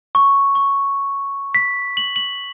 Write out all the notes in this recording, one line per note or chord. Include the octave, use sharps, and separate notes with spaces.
C#6
C#6
B6
F#7
F#7